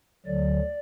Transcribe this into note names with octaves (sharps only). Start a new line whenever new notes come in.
D2 D3 F#3 D5